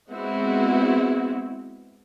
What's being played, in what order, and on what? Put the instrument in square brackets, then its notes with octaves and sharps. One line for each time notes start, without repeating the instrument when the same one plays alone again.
[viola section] G#3 B3 C4 E4 F#4